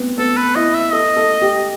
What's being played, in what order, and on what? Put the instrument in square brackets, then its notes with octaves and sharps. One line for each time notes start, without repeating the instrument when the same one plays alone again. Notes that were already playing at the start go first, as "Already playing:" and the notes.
Already playing: [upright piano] B3 C4
[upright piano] B3 [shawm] A4
[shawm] B4
[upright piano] E4 [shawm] D#5
[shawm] E5
[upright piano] A4 [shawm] D#5
[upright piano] A4
G4